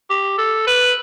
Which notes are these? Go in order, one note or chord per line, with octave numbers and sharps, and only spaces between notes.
G4
A4
B4